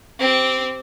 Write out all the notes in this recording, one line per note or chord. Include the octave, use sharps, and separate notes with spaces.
C4 G4